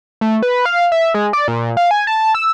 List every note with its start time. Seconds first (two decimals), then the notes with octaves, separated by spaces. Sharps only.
0.21 A3
0.42 B4
0.65 F5
0.92 E5
1.15 G#3
1.33 D5
1.48 A#2
1.77 F5
1.91 G#5
2.07 A5
2.35 E6